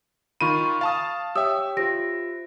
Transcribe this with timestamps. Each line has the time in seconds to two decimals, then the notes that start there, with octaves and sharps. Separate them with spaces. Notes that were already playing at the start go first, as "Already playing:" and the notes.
0.41 D#3 F4 B5 C#6 D#7
0.81 F5 A5 D#6 A6
1.36 G4 C#5 E5 G5 D#6 E6
1.77 F4 G4 C5 A#6 D7